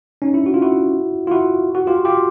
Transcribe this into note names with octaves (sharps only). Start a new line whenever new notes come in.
C#4 D#4
D4 E4
F#4
F4
E4 F#4
F4
E4 F#4
F#4
F4 G4
F4 G4